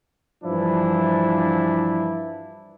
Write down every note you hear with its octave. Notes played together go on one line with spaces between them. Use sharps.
G2 E3 F3 D4 E4